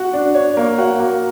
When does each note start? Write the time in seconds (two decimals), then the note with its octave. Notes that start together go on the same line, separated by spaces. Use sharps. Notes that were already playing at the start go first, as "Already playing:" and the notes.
Already playing: F#4
0.13 D4
0.35 C#5
0.57 A#3
0.78 F#4
1.00 A#3